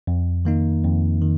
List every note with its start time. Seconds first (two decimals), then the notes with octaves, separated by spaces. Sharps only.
0.07 F2
0.45 D#3 A#3 D#4
0.84 F2
1.22 D#3